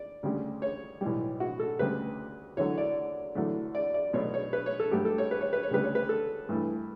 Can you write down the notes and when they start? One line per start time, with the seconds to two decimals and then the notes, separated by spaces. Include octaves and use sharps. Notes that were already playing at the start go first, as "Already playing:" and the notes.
Already playing: D5
0.23 D2 C#3 G3
0.62 C#5
1.01 B1 A2 E3 G3
1.40 F#4
1.60 A4
1.79 D2 C#3 G3 B4
2.57 E2 D3 F#3 C#5
2.78 D5
3.35 E2 D3 F#3 A3
3.75 D5
3.94 D5
4.13 B1 B2 A3 C#5
4.34 C#5
4.53 B4
4.66 C#5
4.80 A4
4.91 G2 F#3 A3 G4
5.05 A4
5.18 C#5
5.31 B4
5.41 C#5
5.53 B4
5.63 C#5
5.71 D2 C#3 G3 B4
5.84 C#5
5.95 B4
6.09 A4
6.49 G2 E3 A3